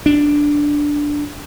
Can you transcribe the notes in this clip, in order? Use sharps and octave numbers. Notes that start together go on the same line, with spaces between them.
D4